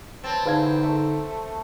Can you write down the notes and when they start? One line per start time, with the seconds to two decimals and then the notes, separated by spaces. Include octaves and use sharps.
0.24 C4 B4 C#5 A5
0.46 E2 D3 D#4 B4 F5 G#6
0.83 A3